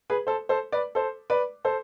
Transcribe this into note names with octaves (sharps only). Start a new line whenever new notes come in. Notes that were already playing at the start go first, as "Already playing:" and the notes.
G#4 B4
A4 C5
A4 C5
B4 D5
A4 C5
B4 D5
A4 C5